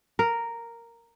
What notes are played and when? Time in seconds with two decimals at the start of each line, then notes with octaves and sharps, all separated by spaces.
0.19 A#4